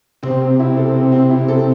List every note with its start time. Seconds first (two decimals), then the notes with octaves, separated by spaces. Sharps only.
0.23 C3 C4
0.41 C4
0.59 E4
0.77 A4
0.94 C4
1.12 C4
1.30 E4
1.48 A4